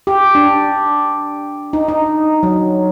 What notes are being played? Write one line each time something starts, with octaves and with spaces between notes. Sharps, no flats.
G4
D4
D#4
D#4
F#3